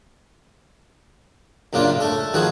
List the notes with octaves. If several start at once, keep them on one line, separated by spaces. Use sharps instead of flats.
F#2 A#2 C#3 D4 F4
A3 A4
D#3 F3 F#4 G#4